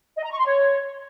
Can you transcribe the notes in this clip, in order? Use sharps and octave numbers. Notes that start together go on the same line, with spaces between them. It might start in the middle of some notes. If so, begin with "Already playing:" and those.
D#5
A#5
C#6
C6
C#5